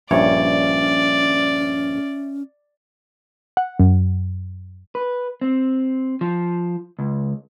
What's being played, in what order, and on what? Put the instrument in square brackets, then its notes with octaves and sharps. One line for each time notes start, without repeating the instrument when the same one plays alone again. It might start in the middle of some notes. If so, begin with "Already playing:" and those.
[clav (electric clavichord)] A#1 G2 C#5 [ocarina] C#4 [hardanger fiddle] D5 [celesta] E5
[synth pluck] F#5
F#2
[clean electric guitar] B4
C4
F3
C#2